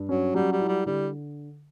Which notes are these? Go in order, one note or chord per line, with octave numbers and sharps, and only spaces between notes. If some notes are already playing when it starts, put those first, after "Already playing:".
Already playing: G2
F#3 C#4
F#3 G3
G3
E4
G3
D3 G3